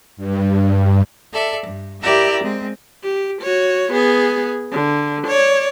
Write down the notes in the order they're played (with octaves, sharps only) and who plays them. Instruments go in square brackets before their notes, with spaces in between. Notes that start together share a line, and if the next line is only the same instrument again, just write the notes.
[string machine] G2
[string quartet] A4 D5 E5
G2
E4 G4 A#4 D5 E5 E6
G#3 C4
[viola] G4
F#4 C#5
B3 G#4
D3
C#5 D5